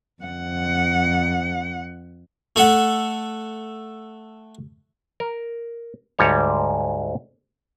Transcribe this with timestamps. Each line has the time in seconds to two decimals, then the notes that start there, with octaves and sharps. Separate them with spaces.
0.23 F2 F#5
2.56 A3 A4 E5 F#5
5.20 A#4
6.19 D2 G#2 G3 C#5